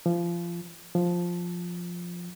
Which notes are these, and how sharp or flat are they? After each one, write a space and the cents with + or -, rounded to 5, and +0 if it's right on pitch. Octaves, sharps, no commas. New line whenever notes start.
F3 -25
F3 +5